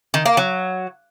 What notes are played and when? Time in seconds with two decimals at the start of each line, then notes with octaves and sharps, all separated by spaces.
0.14 D#3
0.26 A#3
0.37 F#3